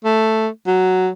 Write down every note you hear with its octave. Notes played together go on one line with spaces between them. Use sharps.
A3
F#3